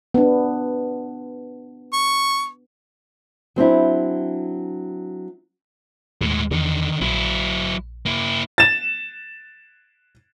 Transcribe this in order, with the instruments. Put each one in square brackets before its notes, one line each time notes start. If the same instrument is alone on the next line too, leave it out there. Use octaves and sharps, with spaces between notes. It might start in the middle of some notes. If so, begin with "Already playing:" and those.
[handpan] B3 D4
[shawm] C#6
[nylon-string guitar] F#3 C4 D4 E4
[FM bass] D#2 [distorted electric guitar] A2 G#3
[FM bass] E2 [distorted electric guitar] D3 D#3
[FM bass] A#1 [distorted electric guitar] F#3 E4
[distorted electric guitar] A#3 E4
[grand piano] A6 E7